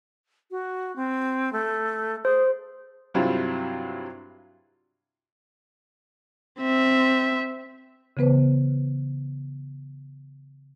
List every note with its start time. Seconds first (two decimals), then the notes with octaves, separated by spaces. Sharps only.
0.51 F#4
0.96 C4
1.53 A3
2.25 G#4 C5
3.14 G2 C3 F#3 C4 E4 F4
6.60 C4 E5
8.17 C#3 E3 B3 B4 C5